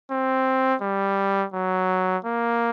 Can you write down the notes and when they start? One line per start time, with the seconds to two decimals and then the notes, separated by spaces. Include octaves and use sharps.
0.11 C4
0.81 G3
1.54 F#3
2.25 A#3